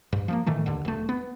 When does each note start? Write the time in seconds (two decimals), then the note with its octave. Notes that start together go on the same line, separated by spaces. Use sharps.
0.12 G2
0.28 F3 A3 A#3
0.46 A2 D#3 E3 A3
0.66 D#2 D3
0.85 E1 A3
1.09 B3